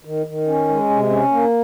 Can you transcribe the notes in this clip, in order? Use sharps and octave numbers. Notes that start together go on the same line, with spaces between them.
D#3
D#3
C#4
G#3
C3
C#4
A#3